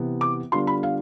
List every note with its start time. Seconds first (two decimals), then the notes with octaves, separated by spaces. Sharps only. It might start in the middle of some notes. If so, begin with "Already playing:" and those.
Already playing: C3 E3 B3
0.21 D6
0.52 D3 G3 B3 D4 F4 C6
0.67 B5
0.83 F5